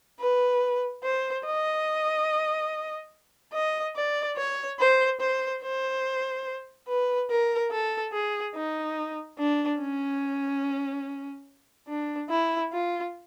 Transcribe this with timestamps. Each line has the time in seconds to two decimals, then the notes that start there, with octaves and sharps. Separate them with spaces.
0.20 B4
1.03 C5
1.46 D#5
3.53 D#5
3.96 D5
4.37 C#5
4.80 C5
5.20 C5
5.62 C5
6.88 B4
7.30 A#4
7.71 A4
8.13 G#4
8.55 D#4
9.38 D4
9.80 C#4
11.88 D4
12.30 E4
12.72 F4